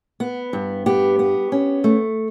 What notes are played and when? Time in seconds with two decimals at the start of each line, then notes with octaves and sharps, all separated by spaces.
0.20 B3
0.53 G2
0.86 B3 G4
1.19 B3
1.52 C#4
1.84 A3